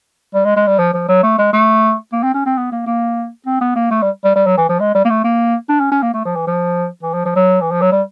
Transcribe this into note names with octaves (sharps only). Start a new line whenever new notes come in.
G3
G#3
G#3
G3
F3
F3
F#3
A3
G#3
A3
A#3
C4
C#4
C4
B3
A#3
A#3
C4
B3
A#3
A3
G3
G3
G3
F#3
E3
F3
G#3
G3
A#3
A3
A#3
D4
C#4
C#4
A#3
A3
F3
E3
F3
E3
F3
F3
F#3
E3
F3
F#3
G3